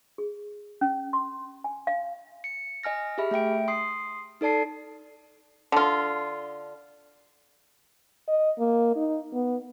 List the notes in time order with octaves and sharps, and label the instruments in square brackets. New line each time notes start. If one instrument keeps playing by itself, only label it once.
[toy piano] G#4
C#4
C6
G#5
F5
[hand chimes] C#7
D#5 G#5 F6 A#6
G4 G#4 E5 B5 F6
A3 E5 G5 D7
C6 D#6 C7
D#4 A4 D5 A5 C7
[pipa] D3 F4
[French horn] D#5
A#3
D#4
B3